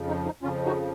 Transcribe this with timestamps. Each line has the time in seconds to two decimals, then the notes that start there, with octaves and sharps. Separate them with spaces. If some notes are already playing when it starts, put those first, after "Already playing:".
Already playing: F2 C#3 F3
0.08 D#4
0.25 D#4
0.42 F2 C#3 F3 C#4 F4
0.65 D#4 F#4